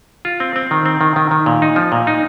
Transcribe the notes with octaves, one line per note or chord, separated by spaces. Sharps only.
F4
C4
C4
D#3
C4
D#3
D#3
D#3
A#2
D#4
F3
A#2
D#4